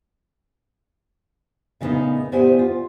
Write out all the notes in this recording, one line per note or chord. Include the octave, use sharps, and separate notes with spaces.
A#2 C#3 G3 A3 B3 D#4
A2 B3 G4 C5 D5 G#5
F4